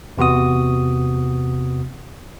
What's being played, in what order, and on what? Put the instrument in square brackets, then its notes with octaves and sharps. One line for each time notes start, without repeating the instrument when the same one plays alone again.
[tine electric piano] E2 C3 B3 F#4 D#6